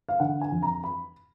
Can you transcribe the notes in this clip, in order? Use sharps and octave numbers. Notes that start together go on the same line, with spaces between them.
F5
D3 F#5
G#5
F2
A#5
B5